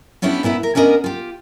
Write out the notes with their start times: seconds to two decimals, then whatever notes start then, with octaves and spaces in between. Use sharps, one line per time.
0.22 B3 C#4 D4 E4 G4 B4
0.43 A#2 B3 E4 A#4 E5
0.63 A#4
0.75 B3 C#4 D4 A#4 D#5
1.04 F4 G4